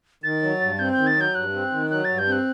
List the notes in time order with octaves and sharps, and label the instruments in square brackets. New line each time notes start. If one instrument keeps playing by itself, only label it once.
[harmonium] D#3 [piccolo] A6
[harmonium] F#3
G2
[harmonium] C4 [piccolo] G6
[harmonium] D#3 [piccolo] G6
[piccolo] A6
[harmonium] F#3 [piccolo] G6
[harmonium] G2 [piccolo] F#6
[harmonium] C4
D#3
[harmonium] F#3 [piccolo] F#6
[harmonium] G2 [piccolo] A6
[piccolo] G6
[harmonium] C4 [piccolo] F#6